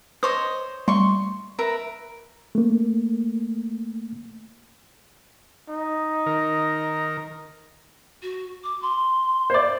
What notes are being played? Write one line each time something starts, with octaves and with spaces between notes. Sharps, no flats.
C5 C#5 D#5 D6
G3 A3 C6 C#6
A#4 B4 E5
A3 A#3
D#4
D#3 A#4
F#4
D6
C6
C5 D5